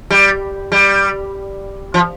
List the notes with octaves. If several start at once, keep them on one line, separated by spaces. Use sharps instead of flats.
G3
G3
F3